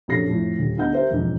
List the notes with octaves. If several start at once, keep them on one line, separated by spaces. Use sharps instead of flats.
A#1 F#2 C3 A4 A#6 C7
F2 A2
D#1
D2 B3 D#4 F#5 G6
G4 A#4 C5 E5
E1 F2 G#2